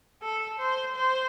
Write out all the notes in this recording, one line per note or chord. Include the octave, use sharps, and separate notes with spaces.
A4
C5
C5